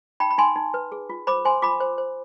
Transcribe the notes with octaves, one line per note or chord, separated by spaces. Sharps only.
D#4 G5 B5
B5
D#4 G#5 C6
D#4
B4
G#4
F4
C5 B5 D6
C5 G#5 C6
F4 B5 D6
C5
C5